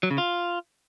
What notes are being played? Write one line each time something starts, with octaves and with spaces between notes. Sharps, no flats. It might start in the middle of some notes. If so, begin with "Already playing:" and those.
F#3
C#3
F4